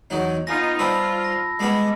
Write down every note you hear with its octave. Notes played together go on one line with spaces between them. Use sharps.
E2 F#3 D#4
B3 D#4 F4 G#5 A#6
G3 C4 F4 B4 A5 B5 E6
A#6
G3 G#3 B3 B4